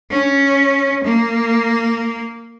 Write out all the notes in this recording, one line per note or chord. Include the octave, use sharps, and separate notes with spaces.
C#4
A#3